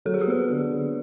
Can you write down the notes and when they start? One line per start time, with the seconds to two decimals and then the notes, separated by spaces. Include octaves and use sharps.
0.05 F#3 A4
0.14 G#4
0.21 G4
0.27 B3 G#4
0.50 D3
0.71 D3